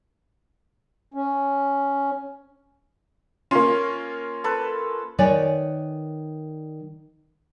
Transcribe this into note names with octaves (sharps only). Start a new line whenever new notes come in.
C#4
A#3 C#4 F4
A4 B4
D#3 B4 C#5 D5 G#5